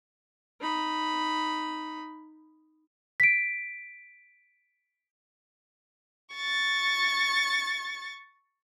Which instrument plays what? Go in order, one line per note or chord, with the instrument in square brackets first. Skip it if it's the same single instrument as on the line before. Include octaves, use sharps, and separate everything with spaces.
[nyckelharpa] D#4 B5
[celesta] B6 D7
[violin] C#6 A6